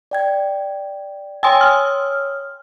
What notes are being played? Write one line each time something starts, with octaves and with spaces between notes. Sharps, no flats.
D5 G5 G#6
C#5 G5 G#5 C6 D#6 E6
F6